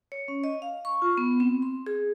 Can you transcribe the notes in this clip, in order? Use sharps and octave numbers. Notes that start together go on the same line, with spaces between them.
C#5
C#4
D#5
F5
C#6
F4
B3
C4
C6
G#4